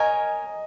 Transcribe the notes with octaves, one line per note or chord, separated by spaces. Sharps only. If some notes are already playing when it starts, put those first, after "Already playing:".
Already playing: A#4 C#5 D#5 G#5